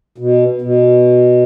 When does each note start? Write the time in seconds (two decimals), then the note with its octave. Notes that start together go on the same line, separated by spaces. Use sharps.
0.18 B2
0.62 B2